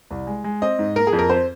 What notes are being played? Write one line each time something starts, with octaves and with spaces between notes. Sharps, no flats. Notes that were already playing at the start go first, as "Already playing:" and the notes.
C2
G#3
G#3
C4 D#5
G#2
A#3 A#4
G#4
F2
A#4
C4 C5